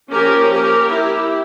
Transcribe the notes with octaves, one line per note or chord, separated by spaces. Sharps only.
F3 A#3 C#4 G4 A#4
G4 A#4
E4 G4